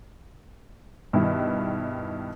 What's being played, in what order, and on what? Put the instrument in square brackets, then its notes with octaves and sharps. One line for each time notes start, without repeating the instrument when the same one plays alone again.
[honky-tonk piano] G2 B2 D#3 E4